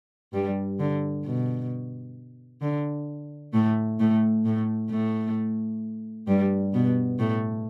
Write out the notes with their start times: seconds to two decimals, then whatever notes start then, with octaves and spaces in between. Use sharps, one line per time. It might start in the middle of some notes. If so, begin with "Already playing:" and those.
0.33 G2 G3
0.79 D3
1.25 B2
2.62 D3
3.53 A2 A3
4.00 A2 A3
4.45 A2 A3
4.90 A2 A3
6.28 G2 G3
6.74 B2 B3
7.19 A2 A3